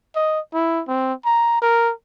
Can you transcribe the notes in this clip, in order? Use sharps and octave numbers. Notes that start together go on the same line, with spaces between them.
D#5
E4
C4
A#5
A#4